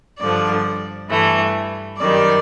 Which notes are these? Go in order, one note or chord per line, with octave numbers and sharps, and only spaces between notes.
G2 D3 F3 D5
G2 E3 A3
F#2 D#3 G3 D5